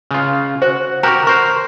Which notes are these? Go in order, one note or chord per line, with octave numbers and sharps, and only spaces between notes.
C#3 F4
F#4 C5
F#4 G4 A#4 A#5 C#6
A#4 C5 C#6